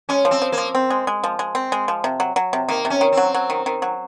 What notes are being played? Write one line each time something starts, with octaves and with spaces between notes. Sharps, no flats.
G#3 C#4
F3
C4
F3
A#3
F3
C4
G#3
G#3
F3
G#3
C4
G#3
F3
C3
F#3
F#3
C3
D#3 A#3
C3
C#4
D#3
F#3 C4
F#3
D#3
D#3
F#3